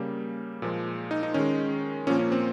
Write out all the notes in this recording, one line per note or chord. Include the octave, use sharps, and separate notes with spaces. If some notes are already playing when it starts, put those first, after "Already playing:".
Already playing: C#3 G3 A#3
A#2 F3 G#3
D#4
D#4
D#3 G#3 C#4
A#2 F3 A#3 C#4
C#4
C4